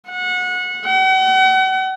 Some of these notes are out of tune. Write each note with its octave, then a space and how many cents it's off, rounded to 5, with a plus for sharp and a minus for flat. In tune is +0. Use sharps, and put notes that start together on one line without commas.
F#5 -25
F#5 +40